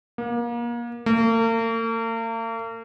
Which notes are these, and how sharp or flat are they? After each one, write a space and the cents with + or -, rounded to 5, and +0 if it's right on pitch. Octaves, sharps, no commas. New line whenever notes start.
A#3 +30
A#3 -45